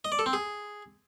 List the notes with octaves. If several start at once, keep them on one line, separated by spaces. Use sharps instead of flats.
D#5
D5
A4
C4
G#4